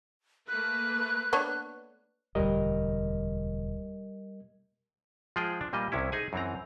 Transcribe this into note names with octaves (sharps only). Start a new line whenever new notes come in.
A3 A#3 B4 F#6
B3 D4 C#5
E1 D2 G3 A#4 D#5
F3 G#3 F4 G#4 G5
D4
A#2 G3 A#3 D#5
C2 C3 C#4 E4
D#4 G#4 G#5
F#2 E3 C4 A#5